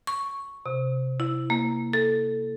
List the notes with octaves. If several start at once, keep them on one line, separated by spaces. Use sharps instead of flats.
C#6
C3
E4
A#3
A4